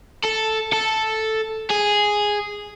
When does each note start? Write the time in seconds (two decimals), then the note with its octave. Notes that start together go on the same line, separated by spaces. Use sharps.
0.25 A4
0.73 A4
1.70 G#4